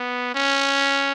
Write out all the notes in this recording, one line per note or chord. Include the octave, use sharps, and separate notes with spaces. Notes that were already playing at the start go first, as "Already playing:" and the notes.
Already playing: B3
C#4